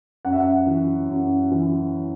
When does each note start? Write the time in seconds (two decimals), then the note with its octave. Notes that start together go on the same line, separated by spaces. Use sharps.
0.25 F#2 F#5
0.32 E5
0.40 F#5
0.66 E3
1.09 F#2
1.52 E3